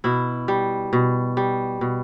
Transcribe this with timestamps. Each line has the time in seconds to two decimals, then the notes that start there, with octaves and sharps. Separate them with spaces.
0.04 B2 E4
0.48 G3
0.93 B2
1.37 G3
1.81 B2